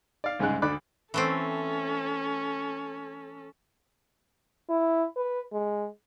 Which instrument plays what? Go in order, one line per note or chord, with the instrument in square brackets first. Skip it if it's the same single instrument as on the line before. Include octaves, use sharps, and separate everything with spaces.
[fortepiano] D5 F5
C2 G#2 C#3 G#3 F#6
D2 D3 D5 B5 D6 F#6
[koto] E3 A3 C4 [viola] C#4 A4
[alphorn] E4
B4
G#3